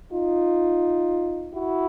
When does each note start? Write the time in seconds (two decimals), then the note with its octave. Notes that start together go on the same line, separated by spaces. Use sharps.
0.12 D#4 F4
1.53 E4 F#4